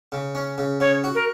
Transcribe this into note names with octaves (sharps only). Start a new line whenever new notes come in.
C#3
C#4
C#3
C#3 C#5
F#4
A#4